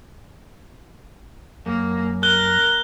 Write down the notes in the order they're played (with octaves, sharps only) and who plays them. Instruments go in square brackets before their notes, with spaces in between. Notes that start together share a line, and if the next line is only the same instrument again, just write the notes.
[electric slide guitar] F#2 [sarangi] A#3
[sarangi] A#4 [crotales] F#6 G7